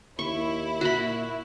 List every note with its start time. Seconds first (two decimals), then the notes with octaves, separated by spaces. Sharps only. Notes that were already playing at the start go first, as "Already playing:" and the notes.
0.19 D#2 E4 C#6
0.81 A#2 F#4 B5